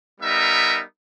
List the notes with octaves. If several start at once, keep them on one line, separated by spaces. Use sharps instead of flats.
G3 B3 D#4 A#4 E5